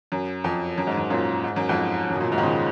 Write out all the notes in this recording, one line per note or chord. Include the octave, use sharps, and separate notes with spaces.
F#2
F2
F#2
G#2
F#2
F#2 A#2
G#2
F#2
F2 G#2
F#2
B2
F#2 A#2
G#2 B2
D#3
A#2 C#3